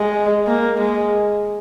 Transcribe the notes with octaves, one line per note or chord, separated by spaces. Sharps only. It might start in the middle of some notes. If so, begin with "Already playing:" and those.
Already playing: G#3
A#3
G#3